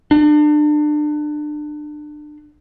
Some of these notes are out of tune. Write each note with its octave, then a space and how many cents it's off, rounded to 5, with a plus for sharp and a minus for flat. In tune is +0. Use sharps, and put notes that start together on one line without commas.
D4 +30